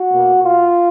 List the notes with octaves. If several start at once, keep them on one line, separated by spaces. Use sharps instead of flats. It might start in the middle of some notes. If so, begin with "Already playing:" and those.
Already playing: F#4
B2 A#3
F4